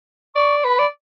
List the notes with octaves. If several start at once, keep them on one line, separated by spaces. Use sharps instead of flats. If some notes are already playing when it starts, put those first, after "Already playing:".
D5 C#6
B4 B5
D5